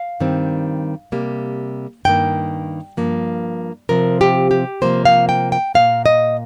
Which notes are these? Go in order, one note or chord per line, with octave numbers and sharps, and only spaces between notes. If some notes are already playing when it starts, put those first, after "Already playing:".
Already playing: F5
G2 D#3 G3 C4
C3 G3 A#3
G2 D#3 A#3 G5
G2 F3 A#3
C3 F3 C4 A#4
G4
G4
C3 F3 A#3 C5
F5
G5
G5
A#2 F3 A#3 F5
D#5